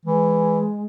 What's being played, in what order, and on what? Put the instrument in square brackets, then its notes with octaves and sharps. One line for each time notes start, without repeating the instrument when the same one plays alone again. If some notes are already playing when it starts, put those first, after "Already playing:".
[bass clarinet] E3 [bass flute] G#3